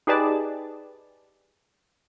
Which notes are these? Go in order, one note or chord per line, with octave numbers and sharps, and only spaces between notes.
D#4 G4 G#4 B4 D5 A5